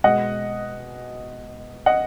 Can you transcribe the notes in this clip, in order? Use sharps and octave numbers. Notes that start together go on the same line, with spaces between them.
B2 G#3 D#5 F#5
D#5 F#5